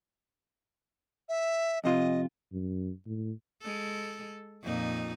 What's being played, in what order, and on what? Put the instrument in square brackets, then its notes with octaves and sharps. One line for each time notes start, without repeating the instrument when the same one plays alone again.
[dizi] E5
[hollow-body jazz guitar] F2 C3 F4 [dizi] D#5
[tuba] F#2
A2
[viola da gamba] G#3 A4
F2 A#2 D#4